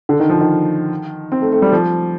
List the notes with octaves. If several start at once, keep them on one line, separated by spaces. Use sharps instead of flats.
D3
D#3
F3
D#3
C4
A3
A3
G3
F3